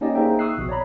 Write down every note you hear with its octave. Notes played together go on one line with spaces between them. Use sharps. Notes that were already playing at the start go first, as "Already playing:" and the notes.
A#3 C#4 D#4 G4 D5 D#5
A#3 D#4 G#4 C5 E5 G5
C#6 D#6 E6 F#6 C7
A#1 B2
C#5 D5 A#5 B5